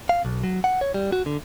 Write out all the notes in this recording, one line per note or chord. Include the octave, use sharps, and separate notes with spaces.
F5
B1
F#3
F#5
C#5
G3
F#4
D3